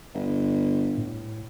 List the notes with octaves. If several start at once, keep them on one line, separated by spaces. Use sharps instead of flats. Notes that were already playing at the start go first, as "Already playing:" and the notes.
G1
A2